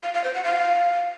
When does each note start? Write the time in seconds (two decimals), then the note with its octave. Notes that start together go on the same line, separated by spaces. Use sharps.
0.03 F5
0.14 F5
0.24 C5
0.34 F#5
0.44 F5